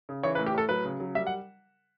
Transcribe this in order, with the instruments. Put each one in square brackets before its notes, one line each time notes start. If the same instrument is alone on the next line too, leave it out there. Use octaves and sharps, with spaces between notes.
[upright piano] C#3
E3 C#5
B4
A2
G4
A2 A4
F#3 B4
C#3
F#3
G3 E5
F#5